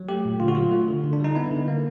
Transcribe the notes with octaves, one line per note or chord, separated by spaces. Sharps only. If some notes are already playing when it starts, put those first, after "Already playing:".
Already playing: F#3
A3 G4
A#2
D3 F4
F#4
F#3 F4
A3
D3
D3
D4
G3 D#4
B3 E4
D3
A#3